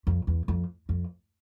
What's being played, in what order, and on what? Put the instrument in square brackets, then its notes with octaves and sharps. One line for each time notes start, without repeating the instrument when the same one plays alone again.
[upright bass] F2
E2
F2
F2